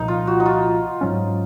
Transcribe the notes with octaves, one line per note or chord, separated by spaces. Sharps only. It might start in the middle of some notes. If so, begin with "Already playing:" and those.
Already playing: C2 A#2 F3 D#4
F4
F#4
D#4
F4
G#2 F#3 C#4